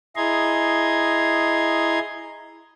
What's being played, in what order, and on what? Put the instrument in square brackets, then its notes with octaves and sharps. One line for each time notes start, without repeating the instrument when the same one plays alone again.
[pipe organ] E4 G#4 D#5 A#5 C6 G#6